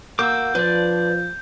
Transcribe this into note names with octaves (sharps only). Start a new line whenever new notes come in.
A#3 F#4 D6 E6 G6
F3 D4 B4 C5 D5